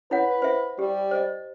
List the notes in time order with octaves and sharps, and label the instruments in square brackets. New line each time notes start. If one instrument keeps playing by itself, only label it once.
[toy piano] E4 C#5 F#5 [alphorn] B4
[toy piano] C5 E5
[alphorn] G3 [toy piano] G4
[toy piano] C5 D#5